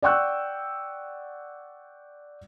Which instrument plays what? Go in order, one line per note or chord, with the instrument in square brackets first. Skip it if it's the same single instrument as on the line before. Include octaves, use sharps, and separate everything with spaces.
[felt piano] D5 F#5 G5 C#6 E6 F#6